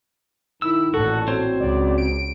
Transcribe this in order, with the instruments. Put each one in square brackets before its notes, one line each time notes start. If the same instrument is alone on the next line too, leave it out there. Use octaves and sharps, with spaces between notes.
[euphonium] D#3 [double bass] E4 [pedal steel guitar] E6
[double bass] A1 A#2 [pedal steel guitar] F#4 [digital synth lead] A4
[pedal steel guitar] C4 C5 C#5 [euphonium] F#4
[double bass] C#2 [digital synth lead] D5
[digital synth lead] D7